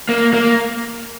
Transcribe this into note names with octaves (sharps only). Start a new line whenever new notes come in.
A#3
A#3